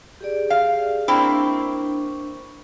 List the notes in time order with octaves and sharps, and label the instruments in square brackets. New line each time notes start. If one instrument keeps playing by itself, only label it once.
[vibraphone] G4 G#4 D5
[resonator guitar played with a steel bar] F5
[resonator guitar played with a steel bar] A#3 C4 E4 [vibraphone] D4 C#6